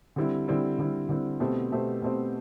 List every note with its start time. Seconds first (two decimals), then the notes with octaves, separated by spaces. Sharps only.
0.16 D3 G3 C4 E4
0.48 D3 G3 C4 E4
0.78 D3 G3 C4 E4
1.09 D3 G3 C4 E4
1.40 B2 A3 C4 G4 C5
1.72 B2 A3 C4 G4 C5
2.02 B2 A3 C4 G4 C5